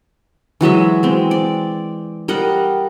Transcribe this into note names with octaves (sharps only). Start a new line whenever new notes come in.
E3 F#3 G#3 E5
G#3 C4
D5
G3 A#4 D#5 F#5